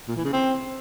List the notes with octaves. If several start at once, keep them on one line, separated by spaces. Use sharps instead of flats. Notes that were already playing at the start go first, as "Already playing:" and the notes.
A#2
E3
C#3
C4